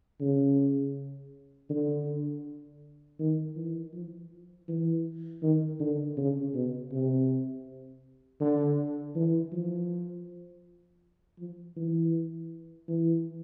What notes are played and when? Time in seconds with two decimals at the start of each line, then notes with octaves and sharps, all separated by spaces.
0.21 C#3
1.70 D3
3.19 D#3
3.56 E3
3.93 F3
4.68 E3
5.43 D#3
5.80 D3
6.17 C#3
6.54 B2
6.92 C3
8.41 D3
9.15 E3
9.52 F3
11.39 F3
11.76 E3
12.88 E3